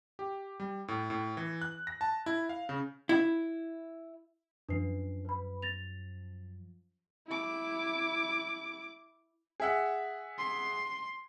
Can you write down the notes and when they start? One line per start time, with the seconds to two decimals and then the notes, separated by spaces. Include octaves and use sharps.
0.19 G4
0.60 G3
0.88 A2
1.10 A2
1.37 E3
1.61 F#6
1.87 A#6
2.01 A5
2.26 E4
2.49 F5
2.69 C#3
3.09 E4
4.69 F#2 F3 D4 B4 C7
5.25 B4 B5
5.62 A6 A#6 F7
7.27 E4 D6
9.60 G#4 E5 F#5
10.38 C6